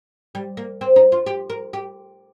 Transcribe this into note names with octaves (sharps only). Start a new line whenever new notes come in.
G3
A#3
C4
D#4
F4
G4
A#4
G4